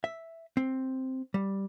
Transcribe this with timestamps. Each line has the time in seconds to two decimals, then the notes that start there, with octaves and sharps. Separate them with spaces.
0.04 E5
0.57 C4
1.34 G3